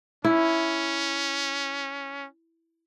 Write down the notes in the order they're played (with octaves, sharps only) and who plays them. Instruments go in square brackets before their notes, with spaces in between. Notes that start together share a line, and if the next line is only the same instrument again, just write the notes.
[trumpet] C#4 [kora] E4